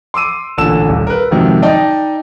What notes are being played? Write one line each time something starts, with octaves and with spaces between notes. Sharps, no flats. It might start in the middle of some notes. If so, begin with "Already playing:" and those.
C6 D6 E6 D#7
A1 A#2 D3 A5 E6 E7
D#1
A#4 B4
F2 G#2 C3 D#3 F#3
D#4 D5 D#5 G5 A5